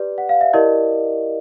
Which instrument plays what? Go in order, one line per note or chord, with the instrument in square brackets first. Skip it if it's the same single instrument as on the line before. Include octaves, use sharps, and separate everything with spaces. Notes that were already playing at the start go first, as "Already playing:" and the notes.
Already playing: [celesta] G4 B4 D5
F#5
F5
E5
E4 G4 A#4 D5 D#5